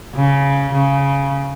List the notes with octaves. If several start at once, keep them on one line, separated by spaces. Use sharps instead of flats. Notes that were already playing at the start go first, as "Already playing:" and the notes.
C#3
C#3